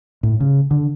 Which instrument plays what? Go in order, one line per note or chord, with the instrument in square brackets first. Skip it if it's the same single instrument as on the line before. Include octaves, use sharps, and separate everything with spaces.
[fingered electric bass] A2
C#3
D3